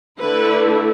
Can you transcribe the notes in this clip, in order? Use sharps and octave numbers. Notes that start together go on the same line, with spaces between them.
D3 A3 E4 B4